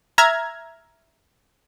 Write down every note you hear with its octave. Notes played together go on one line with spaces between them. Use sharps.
E5 A#5 F6 G#6